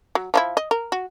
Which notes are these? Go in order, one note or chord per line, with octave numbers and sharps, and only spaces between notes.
F#3
F3 D#4 E4
D#5
A#4
F#4